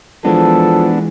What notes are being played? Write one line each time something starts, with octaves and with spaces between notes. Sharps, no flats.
E3 F3 G#3 B3 D4 A4